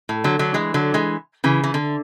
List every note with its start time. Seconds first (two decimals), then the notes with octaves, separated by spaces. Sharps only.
0.09 A2
0.24 D3 F#3
0.39 D3 F#3
0.54 E3 G#3
0.74 D3 F#3
0.94 E3 G#3
1.44 C#3 E3
1.64 E3
1.74 D3